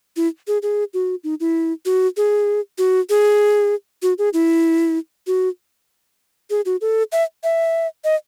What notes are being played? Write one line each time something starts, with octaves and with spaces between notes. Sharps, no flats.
E4
G#4
G#4
F#4
D#4
E4
F#4
G#4
F#4
G#4
F#4
G#4
E4
F#4
G#4
F#4
A4
E5
E5
D#5